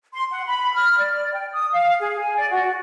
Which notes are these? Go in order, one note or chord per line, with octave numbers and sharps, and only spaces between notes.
C6
F#5
B5
F6
D5
G5
D#6
F5
G#4
G#5
D5
F#4